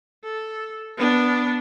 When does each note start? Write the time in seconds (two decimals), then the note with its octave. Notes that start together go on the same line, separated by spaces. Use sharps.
0.24 A4
0.97 B3 D4